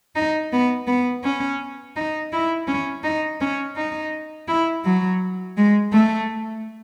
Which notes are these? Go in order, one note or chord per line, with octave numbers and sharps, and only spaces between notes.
D#4
B3
B3
C#4
D#4
E4
C#4
D#4
C#4
D#4
E4
F#3
G#3
A3